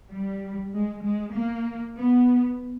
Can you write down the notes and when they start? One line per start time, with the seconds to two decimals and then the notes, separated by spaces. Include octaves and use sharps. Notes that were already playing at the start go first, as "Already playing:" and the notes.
0.11 G3
0.73 G#3
1.03 G#3
1.34 A#3
1.96 B3